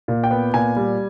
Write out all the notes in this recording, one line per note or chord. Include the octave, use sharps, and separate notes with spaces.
A#2
G5
B3
A#2 G#5
G3